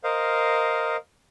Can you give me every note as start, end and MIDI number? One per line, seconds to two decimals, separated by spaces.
0.04 0.97 70
0.04 0.97 72
0.04 0.97 75
0.04 0.97 77